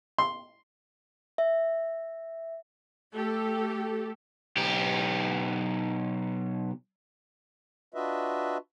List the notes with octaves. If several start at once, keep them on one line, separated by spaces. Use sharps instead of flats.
C6
E5
A3 G4 A4
B1 G4
D4 F4 F#4 B4 D#5 E5